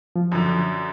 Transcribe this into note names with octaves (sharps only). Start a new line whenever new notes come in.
F3
F#2 D3